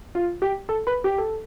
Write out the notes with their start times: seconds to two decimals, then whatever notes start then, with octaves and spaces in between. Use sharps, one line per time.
0.15 F4
0.42 G4
0.69 A4
0.87 B4
1.04 G4
1.18 A4